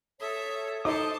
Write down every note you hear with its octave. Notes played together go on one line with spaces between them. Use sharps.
A4 C#5 E5 D#6
D#4 A4 C5 A5 D6 D#6